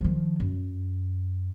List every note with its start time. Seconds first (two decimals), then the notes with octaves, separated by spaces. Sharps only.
0.01 D#3 F3
0.40 F#2